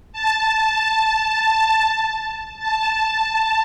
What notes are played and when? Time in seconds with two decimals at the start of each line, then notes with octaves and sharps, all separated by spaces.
0.13 A5
2.59 A5